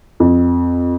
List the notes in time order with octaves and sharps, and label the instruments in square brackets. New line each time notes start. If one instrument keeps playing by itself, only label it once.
[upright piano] F2